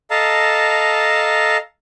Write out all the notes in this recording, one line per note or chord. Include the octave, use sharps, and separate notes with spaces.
A4 D#5 F5 A5 A#5